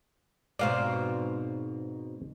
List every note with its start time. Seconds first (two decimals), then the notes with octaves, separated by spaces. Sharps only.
0.59 G#2 B2 C4 D5 F5